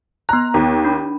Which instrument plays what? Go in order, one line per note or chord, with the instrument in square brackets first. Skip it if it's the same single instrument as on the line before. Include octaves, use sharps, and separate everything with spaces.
[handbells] B3 F#6 [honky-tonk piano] A#5
[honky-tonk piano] D#2
[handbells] D4 B5